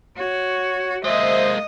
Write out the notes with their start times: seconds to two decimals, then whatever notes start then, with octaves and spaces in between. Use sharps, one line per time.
0.17 F#4 C#5
1.04 G#3 A#3 C5 D#5 E5